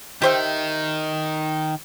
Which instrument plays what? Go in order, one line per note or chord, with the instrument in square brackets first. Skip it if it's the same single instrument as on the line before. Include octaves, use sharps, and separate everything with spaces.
[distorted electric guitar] D#3 [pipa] G4 C5 E5